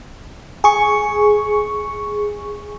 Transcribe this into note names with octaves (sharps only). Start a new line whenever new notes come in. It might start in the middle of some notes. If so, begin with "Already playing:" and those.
G#4 C#6